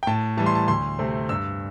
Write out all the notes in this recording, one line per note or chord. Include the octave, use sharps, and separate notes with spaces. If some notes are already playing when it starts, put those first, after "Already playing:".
G5
A2 A5
E3 G3 A5
C6
A5
D2 C6
C3 A3 C4
G2 E6